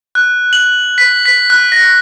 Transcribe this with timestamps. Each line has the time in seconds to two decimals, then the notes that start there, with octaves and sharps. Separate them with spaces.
0.15 F#6
0.53 F#7
0.98 B6
1.26 B6
1.50 F#6
1.72 A#6